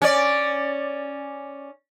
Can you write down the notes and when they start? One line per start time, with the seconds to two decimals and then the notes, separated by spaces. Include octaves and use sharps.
0.02 C#4 D5